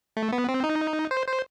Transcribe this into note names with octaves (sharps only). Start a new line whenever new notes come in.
A3
B3
C4
D#4
C5
C5